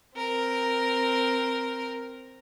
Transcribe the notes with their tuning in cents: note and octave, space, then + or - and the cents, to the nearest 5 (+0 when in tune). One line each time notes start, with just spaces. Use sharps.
C4 +0 A#4 +0